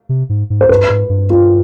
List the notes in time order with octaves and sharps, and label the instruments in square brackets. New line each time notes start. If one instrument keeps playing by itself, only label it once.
[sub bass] C3
G#2
G#2
[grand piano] C5
[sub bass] G2 [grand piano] B4
[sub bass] G#2
G2
[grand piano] F4